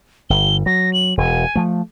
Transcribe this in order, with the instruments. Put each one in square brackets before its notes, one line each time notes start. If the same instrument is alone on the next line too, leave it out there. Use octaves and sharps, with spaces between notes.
[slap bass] G1 [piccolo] G7
[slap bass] F#3 [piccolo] A#6
[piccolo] F#7
[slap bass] E1 [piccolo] G#5
[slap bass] F3 A3